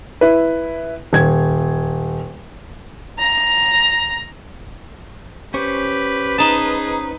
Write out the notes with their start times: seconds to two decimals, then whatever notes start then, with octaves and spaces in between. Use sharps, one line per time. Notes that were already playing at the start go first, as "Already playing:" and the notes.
0.21 E4 B4
1.13 D#1 G#6
3.19 A#5
5.54 C#4 G4 B4 C5 C#6
6.38 D#4 G#4 A5